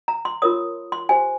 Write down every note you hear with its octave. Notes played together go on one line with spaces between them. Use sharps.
A#5
C6
F4 A#4 C#5 D#6
C6
G4 C5 G#5